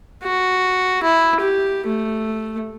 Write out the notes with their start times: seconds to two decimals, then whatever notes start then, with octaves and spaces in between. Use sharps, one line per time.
0.23 F#4
1.03 E4
1.41 G4
1.87 A3